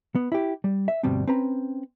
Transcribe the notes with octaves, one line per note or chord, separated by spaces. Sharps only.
B3
E4 G4
G3
E5
D2 G2 B2 G3 C4
C4 C#4 B4 A#5